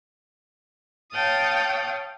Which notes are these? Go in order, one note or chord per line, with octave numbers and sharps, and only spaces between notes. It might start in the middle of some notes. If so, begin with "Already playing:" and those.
C#5 F5 G5 A5 D#6